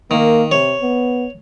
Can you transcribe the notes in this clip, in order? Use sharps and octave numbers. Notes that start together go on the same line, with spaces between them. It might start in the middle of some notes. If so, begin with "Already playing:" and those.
D#3 A#3
C3 C#5
B3